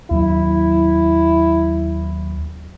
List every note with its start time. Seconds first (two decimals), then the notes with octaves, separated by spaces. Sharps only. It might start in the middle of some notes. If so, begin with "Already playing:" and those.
0.11 D#2 F#3 E4